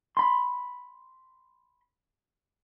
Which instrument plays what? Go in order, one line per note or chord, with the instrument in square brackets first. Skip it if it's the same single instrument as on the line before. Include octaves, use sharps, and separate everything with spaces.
[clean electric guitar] B5 C6